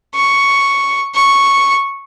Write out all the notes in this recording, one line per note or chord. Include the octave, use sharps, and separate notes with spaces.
C#6
C#6